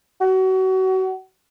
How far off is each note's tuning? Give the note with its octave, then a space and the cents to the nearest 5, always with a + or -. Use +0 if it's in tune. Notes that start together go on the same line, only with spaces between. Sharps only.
F#4 +30